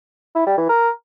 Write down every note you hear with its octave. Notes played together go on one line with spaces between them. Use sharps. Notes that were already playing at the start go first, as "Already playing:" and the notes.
E4
G3
E3
A#4